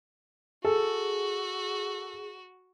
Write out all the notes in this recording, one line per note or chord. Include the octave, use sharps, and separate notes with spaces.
F#4 G#4 A4